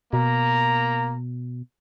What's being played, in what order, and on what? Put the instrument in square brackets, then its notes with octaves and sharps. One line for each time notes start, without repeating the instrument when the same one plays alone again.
[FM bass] B2 [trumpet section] A#3 A#5